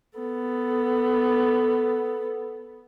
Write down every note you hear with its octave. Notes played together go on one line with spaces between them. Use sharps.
B3 A4